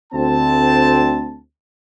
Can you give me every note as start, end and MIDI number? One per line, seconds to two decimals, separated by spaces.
0.13 1.40 38
0.13 1.40 60
0.13 1.40 81